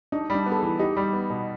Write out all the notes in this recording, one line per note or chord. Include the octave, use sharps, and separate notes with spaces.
D4 D#4
G3 D4
B3
A4
E3 G#4
D#4 G4
G3
B3
B2